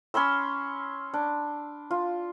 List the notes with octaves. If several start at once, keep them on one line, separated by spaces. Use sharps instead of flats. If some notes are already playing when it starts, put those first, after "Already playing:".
C#4 B5 C6 E6
D4
F4